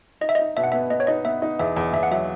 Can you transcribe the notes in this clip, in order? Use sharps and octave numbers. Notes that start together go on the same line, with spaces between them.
D#4 D#5
E5
D#4 D#5
B2 E5
F#5
B3 E5
B3 D#5
C#5
D#4 D#5
B3 E5
D#4
E2 E5
E2
E2 E5
F#5
F#3 E5